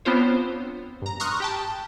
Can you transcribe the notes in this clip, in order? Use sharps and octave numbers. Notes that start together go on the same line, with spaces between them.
B3 C4 D4 F4 C5 C#5
G2 A#5
A#5 C6 C#6 D#6 F6 F#6
G4 G5 A5